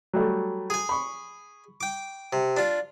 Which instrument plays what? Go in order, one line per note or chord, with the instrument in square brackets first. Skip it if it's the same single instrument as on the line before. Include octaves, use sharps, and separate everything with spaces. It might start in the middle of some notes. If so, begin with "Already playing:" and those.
[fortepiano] F#3 G3 A3
[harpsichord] G#4 G#5
[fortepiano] B5 C#6
[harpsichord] G5 D6
C3
D4 F4